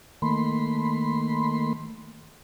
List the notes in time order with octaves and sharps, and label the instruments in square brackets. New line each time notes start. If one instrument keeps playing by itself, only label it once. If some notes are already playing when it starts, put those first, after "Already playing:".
[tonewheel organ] D#3 A3 A#3 B5 C6